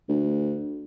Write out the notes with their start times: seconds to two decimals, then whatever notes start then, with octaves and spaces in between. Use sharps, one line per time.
0.09 D2